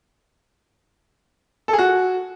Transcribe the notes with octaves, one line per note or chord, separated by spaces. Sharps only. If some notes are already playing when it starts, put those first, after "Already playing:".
A4
G#4
F#4